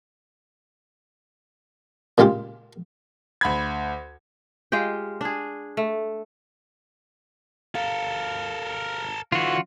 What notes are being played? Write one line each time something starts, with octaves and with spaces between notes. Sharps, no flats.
A#2 C#3 G#3 F4 G4
D2 B5 G#6
G#3 F4 G4 G5
D4 G#4
A3
A4 A#4 F5
D3 E3 F4 F#4